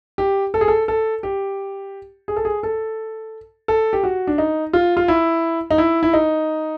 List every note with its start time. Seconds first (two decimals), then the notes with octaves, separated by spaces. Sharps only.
0.18 G4
0.54 A4
0.61 G#4
0.68 A4
0.88 A4
1.23 G4
2.28 G#4
2.36 A4
2.45 G#4
2.63 A4
3.68 A4
3.93 G4
4.04 F#4
4.27 D4
4.38 D#4
4.73 F4
4.97 F4
5.08 E4
5.71 D#4
5.78 E4
6.03 E4
6.13 D#4